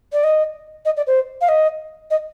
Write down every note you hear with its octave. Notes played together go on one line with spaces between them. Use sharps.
D5
D#5
D#5
D5
C5
F5
D#5
D#5